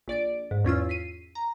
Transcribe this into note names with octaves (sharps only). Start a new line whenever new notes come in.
A#1 D5 A6 D7
G#2
E2 C#4 F4 E6
B6 C7 D#7
A#5